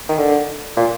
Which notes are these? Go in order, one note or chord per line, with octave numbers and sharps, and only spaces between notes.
D#3
D3
A#2